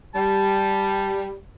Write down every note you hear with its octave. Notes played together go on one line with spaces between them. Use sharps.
G3 A5